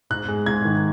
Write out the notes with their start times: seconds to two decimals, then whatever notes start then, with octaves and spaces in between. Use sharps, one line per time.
0.10 G#2 F#6
0.28 G#3
0.46 G#2 G#6
0.65 D#3